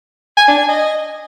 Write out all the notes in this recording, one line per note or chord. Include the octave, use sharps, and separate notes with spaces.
G#5
D4
G#5
D#5